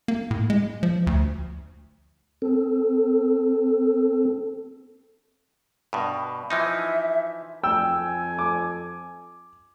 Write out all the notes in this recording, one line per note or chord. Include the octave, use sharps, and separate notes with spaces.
A#3
A2
G#3
F3
D2
C4 A4
G2 B2
E3 F3 D#4 E5
F2 A4 G5 G#5 E6
D6